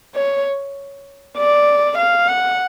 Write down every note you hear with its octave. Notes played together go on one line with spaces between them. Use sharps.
C#5
D5
F5
F#5